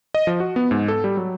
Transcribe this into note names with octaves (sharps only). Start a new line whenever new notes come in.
D#5
F3
F#4
B3
G#2
A4
G3
F#3